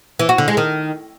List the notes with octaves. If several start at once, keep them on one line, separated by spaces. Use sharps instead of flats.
E3
F#4
D3
G#3
D#3